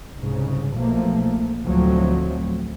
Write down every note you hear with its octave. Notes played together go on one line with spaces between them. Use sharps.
C2 G#2 C#3
B1 B2 F3 A3 A#3
D2 A2 F3 F#3 A3 C4